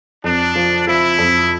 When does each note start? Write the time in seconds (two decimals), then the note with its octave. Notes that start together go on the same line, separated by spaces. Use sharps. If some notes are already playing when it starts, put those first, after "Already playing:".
0.24 F2 D4
0.56 F3
0.87 F3 E4
1.18 F2